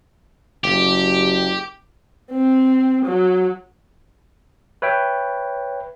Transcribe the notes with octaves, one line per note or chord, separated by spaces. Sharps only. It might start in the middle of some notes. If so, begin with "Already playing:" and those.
F#1 G4
C4
F#3
B4 C#5 E5 G5